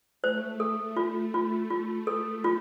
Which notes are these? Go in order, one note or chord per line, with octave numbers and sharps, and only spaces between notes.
A3 C5
A3 A4
F4
F4
F4
A4
F4